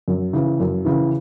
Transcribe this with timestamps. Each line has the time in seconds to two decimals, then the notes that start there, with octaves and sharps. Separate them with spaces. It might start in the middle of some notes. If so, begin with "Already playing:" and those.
0.08 F#2
0.33 C#3 E3
0.60 F#2
0.85 C#3 E3